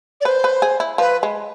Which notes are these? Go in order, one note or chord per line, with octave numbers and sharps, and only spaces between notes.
D5
B4 C5
B4
G#4
E4
F3 B4
G#3